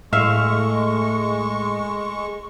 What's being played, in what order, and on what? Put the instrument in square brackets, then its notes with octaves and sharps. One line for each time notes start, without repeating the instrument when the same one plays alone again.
[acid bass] A2 [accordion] G#3 C#6 [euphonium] A3 [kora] E5 F5